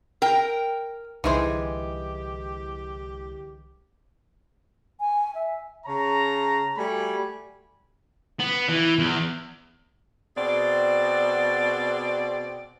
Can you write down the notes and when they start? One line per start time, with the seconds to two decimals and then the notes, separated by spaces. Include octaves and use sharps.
0.22 A#4 G5
1.24 C2 D3 E3 G#3 D#4 G4 G#4 C5
5.00 G#5
5.35 E5
5.86 C#3 C#5 A5 A#5
6.77 G3 A3 F#4 D5 G#5 B5
8.40 B3
8.69 E3
8.99 E2
10.36 B2 C4 G#4 D5